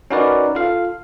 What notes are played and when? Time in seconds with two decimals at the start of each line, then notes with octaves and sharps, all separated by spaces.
0.10 C#4 D#4 F#4 A#4 B4 D5
0.55 F4 A4 F5